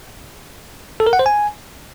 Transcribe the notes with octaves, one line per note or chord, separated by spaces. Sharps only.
A4
A#4
F#5
C5
G#5